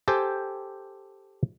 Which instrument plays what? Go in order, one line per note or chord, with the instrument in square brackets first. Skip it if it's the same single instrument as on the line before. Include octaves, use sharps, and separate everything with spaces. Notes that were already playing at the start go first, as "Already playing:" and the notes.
[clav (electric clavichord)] G4 A4 C5 G5 G#5